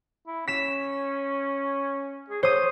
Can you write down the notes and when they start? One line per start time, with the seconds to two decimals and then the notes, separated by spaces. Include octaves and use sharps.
0.27 E4
0.48 C#4 B6 E7
2.30 G#4
2.43 C5 C#5 D#6